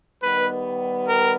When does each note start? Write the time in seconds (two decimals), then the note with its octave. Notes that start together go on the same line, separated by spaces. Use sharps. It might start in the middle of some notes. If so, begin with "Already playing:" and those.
0.22 D#3 G3 B3 B4
1.08 A#4